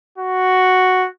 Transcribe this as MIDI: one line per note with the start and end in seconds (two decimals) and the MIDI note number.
0.18 1.08 66